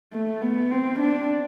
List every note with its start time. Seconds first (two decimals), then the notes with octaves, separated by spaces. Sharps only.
0.13 A3
0.42 B3
0.71 C4
1.00 D4